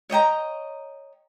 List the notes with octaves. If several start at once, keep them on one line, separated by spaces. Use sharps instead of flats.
C#5 D#5 G5 A#5